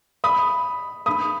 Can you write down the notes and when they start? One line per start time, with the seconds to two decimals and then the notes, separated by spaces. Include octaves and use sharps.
0.24 B5 D#6
1.06 B5 D#6